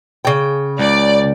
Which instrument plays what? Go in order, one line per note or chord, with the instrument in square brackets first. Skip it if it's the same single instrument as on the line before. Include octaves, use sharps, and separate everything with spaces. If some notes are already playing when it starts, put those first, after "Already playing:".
[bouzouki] C#3 G5
[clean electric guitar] C#2 [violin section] D5